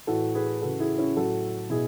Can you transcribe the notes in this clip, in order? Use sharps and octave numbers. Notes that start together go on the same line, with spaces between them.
A2 E3 F#4 A4
G#4 B4
C#3 E3 F#4 A4
E4 G#4
C#4 E4
A2 F#3 F#4 A4
B2 E4 G#4